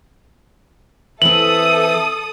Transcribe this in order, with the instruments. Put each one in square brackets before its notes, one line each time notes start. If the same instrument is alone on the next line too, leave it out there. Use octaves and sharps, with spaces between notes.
[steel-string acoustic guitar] E3 C4 [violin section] A4 D#6 [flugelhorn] E5 [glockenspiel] F#7